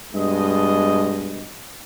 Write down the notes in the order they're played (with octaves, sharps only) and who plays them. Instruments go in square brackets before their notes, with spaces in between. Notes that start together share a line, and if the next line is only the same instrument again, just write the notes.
[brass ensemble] G2 B2 G#3 D#5